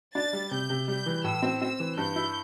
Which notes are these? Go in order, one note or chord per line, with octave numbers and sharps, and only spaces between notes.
D4 A6
G3
C3 G6
C3
G3 G6
E3
A2 E6
C4
C4 E6
E3
G2 G6
E4